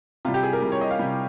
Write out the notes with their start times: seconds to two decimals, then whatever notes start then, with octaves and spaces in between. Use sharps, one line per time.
0.25 C3 F4
0.28 G3
0.34 G4
0.43 G#4
0.53 A#4
0.62 C3 G3
0.72 C#5
0.81 D#5
0.91 F5
0.99 C3 G3